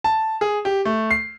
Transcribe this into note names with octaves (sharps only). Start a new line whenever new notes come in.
A5
G#4
G4
A3
C7